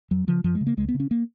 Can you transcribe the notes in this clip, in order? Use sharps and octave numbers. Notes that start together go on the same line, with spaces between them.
F2 F#3
C#3 F3
F#2 F3
G#3
C#3
A#3
C#2 G#3
B3
C#3
C#4
A#3